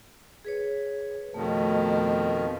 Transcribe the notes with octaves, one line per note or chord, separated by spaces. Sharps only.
G#4 B4 C#5
F2 B2 D#3 A3